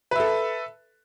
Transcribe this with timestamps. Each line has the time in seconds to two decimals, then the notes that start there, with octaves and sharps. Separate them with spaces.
0.11 B4
0.16 E5
0.20 A4